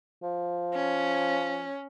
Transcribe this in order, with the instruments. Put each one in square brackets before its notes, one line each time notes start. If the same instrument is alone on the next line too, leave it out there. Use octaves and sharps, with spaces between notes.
[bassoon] F3
[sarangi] C#4